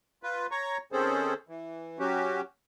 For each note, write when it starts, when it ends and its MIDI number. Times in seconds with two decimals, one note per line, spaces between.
0.23 0.47 65
0.23 0.47 71
0.51 0.77 73
0.51 0.77 82
0.51 0.77 85
0.92 1.34 51
0.92 1.34 60
0.92 1.34 61
0.92 1.34 68
0.92 1.34 69
0.92 1.34 72
1.48 1.99 52
1.99 2.41 54
1.99 2.41 61
1.99 2.41 66
1.99 2.41 67